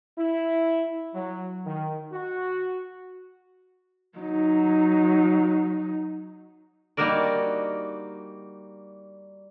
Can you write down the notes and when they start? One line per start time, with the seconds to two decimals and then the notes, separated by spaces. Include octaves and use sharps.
0.19 E4
1.15 F#3
1.66 D#3
2.12 F#4
4.19 F#3 D#4
6.97 G3 A#3 D#4 F#4 A#4 D5